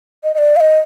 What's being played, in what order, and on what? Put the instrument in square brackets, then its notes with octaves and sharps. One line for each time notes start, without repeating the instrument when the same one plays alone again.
[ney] D#5
D#5
D5
F5
D#5